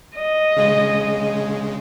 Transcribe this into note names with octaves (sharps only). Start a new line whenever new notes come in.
D#5
C#3 G#3